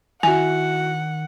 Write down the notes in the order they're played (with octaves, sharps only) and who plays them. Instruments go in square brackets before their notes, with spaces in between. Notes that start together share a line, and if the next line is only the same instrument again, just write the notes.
[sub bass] D#3 [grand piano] E4 F#4 [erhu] F#5 [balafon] G#5